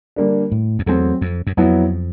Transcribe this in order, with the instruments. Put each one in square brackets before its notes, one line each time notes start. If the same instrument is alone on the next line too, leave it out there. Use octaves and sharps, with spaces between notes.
[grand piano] D3 G3 A#3 D4
[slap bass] A2
F2
[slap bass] E2 [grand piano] F#3 A3 C4
[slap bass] F2
F#2
[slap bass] F2 [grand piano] F#3 B3 E4